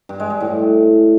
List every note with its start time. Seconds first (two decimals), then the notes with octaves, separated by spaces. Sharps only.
0.09 G2
0.20 G#3
0.30 G2
0.40 A2